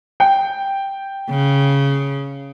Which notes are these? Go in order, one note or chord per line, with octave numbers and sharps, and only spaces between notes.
G5
C#3